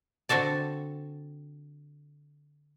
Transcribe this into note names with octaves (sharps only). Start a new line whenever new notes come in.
D3 C4 F#4 A4 D5